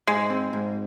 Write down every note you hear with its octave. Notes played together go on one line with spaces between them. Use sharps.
G#2 G#3
C4
G#2